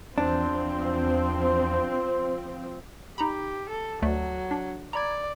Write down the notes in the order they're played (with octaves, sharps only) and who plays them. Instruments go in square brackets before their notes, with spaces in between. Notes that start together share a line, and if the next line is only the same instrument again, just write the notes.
[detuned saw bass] E2 [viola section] F3 C4 [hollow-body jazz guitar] D4 [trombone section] C5
[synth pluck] D#4 A#5 B5 [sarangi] G4
[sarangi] A4
[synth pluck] D2 A3 D5 [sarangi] F#3
[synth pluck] D4
[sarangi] D5 [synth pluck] A#5 B5 G#6